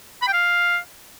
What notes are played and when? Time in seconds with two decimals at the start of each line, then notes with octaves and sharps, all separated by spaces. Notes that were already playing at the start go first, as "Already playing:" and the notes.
0.22 B5
0.28 G5
0.33 F5